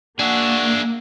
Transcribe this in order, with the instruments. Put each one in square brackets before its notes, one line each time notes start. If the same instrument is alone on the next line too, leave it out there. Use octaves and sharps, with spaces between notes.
[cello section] A#3 [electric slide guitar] D4 [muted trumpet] F#4 [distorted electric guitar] G#4 E5